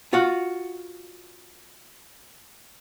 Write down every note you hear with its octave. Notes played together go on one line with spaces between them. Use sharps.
F4 F#4 F#5